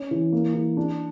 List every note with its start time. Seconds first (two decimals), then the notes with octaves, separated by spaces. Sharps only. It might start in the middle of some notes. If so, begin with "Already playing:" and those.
Already playing: C#4
0.11 E3
0.32 A#3
0.54 E3
0.77 D4